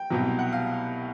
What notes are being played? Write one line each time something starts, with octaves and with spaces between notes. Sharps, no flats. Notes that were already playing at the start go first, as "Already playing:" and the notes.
Already playing: G5
C2 B2 F#3
F#5
F5